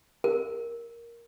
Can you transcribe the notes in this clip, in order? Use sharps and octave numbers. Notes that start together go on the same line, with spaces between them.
A#4